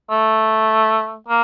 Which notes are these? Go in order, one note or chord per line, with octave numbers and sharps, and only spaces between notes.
A3
A#3